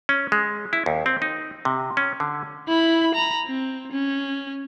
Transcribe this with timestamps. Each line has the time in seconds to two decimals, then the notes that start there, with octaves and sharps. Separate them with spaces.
0.09 C#4
0.32 G#3
0.73 E4
0.86 D#2
1.06 C4
1.22 D#4
1.65 C3
1.97 C#4
2.20 D3
2.68 E4 B5
3.15 A#5 B5
3.47 C4
3.92 C#4